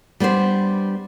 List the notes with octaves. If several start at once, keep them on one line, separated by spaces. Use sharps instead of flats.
G3 B3 D4 C5